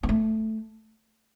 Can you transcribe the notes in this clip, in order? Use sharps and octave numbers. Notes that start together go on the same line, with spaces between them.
B3
A3